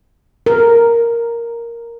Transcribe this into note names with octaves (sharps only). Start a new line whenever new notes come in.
A#4